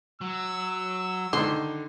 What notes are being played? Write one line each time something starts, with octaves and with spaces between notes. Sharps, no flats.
F#3 E6
D3 D#3 C6